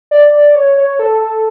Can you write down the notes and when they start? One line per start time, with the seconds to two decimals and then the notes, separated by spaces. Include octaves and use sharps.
0.11 D5
0.55 C#5
0.77 C#5
0.99 A4
1.21 A4